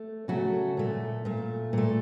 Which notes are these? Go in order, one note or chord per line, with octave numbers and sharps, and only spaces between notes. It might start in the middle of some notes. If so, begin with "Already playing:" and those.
Already playing: A3
C#3 F#3 A3 F#4
A#2 A3
A#2 A3
A#2 A3